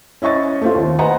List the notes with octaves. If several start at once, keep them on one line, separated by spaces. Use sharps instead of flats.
C#4 E4 D#5 C#6 A6
A3 C4 F4
D#2
B4 C5 D#5 F#5 G#5 A#5